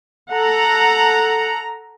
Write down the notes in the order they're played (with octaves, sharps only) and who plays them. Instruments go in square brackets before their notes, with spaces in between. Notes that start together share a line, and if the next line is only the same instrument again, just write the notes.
[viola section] A4 F#5 A#5